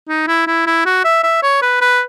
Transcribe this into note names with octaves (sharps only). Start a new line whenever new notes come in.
D#4
E4
E4
E4
F#4
E5
E5
C#5
B4
B4